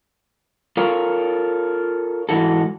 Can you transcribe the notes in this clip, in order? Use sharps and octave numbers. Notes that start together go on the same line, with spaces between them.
F4 A4 A#4 C#5
G#2 C3 E3 F#4 A4